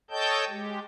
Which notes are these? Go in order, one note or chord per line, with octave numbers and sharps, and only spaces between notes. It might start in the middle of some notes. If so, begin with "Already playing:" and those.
A4 C#5 D#5 G5 A5 G6
G#3 G4